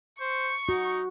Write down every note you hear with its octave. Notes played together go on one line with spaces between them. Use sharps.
C5 C#6
D#4 F#4